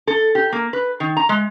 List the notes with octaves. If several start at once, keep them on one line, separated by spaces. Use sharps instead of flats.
A4
G4
A#3
B4
D#3
A#5
G#3